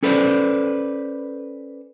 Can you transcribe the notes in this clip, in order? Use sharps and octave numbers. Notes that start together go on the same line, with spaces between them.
C#4 A4 B4 C5 D5